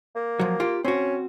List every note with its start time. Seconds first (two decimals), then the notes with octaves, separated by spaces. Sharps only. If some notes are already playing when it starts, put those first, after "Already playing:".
0.16 A#3
0.40 F3 F#3
0.60 F4 G4
0.85 C4 C#4 F#4